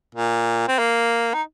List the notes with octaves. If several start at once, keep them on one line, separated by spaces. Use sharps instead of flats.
A#2
C4
A#3
D#4